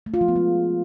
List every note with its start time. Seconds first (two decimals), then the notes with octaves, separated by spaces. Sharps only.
0.06 A3
0.14 F4
0.21 F3
0.28 B3
0.36 G#3